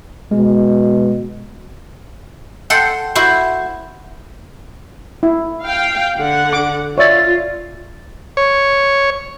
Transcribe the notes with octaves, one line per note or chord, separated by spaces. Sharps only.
B2 G#3
A4 F#5 G5 C6
E4 F#4 C5
E4
F5 G5
D3 F#5
D6
F4 C#5 D5 E5 A6
C#5